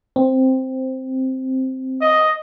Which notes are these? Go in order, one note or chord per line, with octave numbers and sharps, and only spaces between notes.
C4
D#5